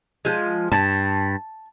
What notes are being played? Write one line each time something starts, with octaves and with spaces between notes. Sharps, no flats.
F3 G#3
G2 A5